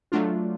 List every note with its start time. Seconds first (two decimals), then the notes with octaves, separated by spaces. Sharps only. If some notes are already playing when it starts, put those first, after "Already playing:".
0.12 F#3 A3 D4 F4